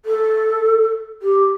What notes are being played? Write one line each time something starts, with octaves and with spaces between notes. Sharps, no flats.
A4
G4